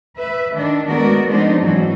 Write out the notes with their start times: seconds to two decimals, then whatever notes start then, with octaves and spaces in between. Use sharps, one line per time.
0.18 B4 E5
0.55 D#3 D4
0.89 G#3 A3 B3 F#4 A#4 D5
1.27 F3 G#3 B3 C4 D4 D#4
1.59 G#2 E3 F#3